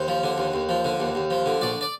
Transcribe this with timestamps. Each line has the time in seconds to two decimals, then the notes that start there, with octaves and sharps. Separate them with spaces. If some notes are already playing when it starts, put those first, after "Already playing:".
Already playing: D#2 C5
0.08 F3
0.24 D3
0.38 D#2
0.54 D#2
0.69 F3
0.85 D3
1.00 D#2
1.15 D#2
1.31 F3
1.46 D3
1.61 A#1 D5
1.81 D5